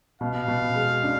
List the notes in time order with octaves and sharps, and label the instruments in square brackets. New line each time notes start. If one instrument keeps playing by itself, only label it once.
[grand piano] B2 [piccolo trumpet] F5
[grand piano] B2
G#3
D4